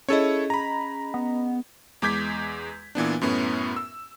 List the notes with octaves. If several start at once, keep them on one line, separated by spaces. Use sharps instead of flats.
C#4 E4 G#4 A4 C#5 D#5
A#5 B5
B3
E2 G#3 D6 G6 G#6 B6
A#2 E3 B3 D4
F#2 A2 B3 C#4 E4
E6